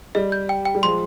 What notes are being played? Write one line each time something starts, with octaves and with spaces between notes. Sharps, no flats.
G3 D#5
G6
G5
G5
G3
F3 G#3 C6